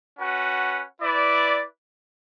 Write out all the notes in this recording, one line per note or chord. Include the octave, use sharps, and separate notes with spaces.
C#4 F#4 B4 F#5
E4 B4 D5